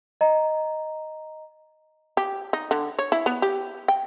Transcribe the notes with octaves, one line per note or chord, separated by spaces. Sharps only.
D#5 A#5
G4
D#4
D3
C#5
E4
B3
G4
G5